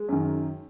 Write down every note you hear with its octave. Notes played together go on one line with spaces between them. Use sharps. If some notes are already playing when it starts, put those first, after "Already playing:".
Already playing: G#3
F#2 D#3